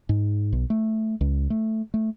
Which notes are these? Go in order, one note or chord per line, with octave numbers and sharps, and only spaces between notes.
G#2
B1
A3
C#2
A3
A3